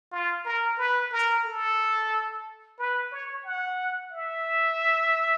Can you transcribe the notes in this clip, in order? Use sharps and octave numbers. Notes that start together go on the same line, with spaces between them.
F4
A#4
B4
A#4
A4
B4
C#5
F#5
E5